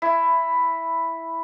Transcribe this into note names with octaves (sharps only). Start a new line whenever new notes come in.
E4